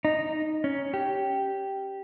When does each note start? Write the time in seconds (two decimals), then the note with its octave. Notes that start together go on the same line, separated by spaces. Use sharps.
0.05 D#4
0.64 C#4
0.94 G4